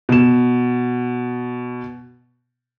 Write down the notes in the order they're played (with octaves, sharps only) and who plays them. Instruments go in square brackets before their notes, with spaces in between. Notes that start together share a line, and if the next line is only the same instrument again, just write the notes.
[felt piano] B2 E7